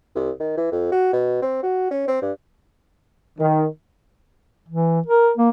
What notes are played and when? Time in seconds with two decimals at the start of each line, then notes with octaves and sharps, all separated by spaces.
0.16 C2
0.40 D#3
0.57 E3
0.72 F2
0.92 F#4
1.13 B2
1.42 C4
1.63 F#4
1.91 C#4
2.08 C4
2.22 G2
3.39 D#3
4.69 E3
5.07 A#4
5.38 A#3